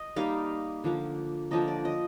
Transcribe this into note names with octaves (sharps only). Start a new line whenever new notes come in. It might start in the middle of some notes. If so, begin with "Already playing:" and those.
Already playing: D#5
G3 A#3 D#4 F5
D3 F3 A#3
D3 F3 A#3 D#5
D5
D#5